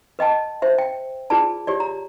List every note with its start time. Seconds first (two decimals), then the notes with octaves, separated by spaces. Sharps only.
0.19 B4 D#5 G5 A5
0.62 C5 E5
0.78 G5
1.30 F4 G#4 B4 D5 A5
1.67 G4 C#5 D5
1.80 A#5